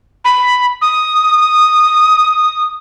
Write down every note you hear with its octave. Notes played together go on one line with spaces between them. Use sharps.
B5
D#6